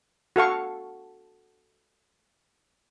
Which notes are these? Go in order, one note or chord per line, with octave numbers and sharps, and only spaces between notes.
F#4 A4 F5 C#6